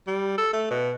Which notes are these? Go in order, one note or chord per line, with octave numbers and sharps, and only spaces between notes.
G3
A4
A3
B2